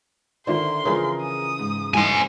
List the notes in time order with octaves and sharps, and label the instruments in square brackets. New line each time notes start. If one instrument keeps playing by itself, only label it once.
[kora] D3 [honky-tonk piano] D#3 E4 C5 [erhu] C6
[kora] C#3 E3 F4 [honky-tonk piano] F3 G#4 A#4
[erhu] D#6
[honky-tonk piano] G#2
[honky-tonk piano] G#1 G2 E3 [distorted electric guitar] C5 G#5